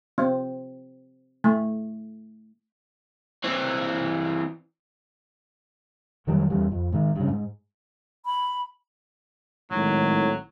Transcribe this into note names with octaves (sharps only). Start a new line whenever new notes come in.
C4
A3
E3 C4
F2 D#3 F#3 G3
E2 E3 G3
F2
G#2 D#3
G2 C#3
G#2
B5
G#1 A2 F#3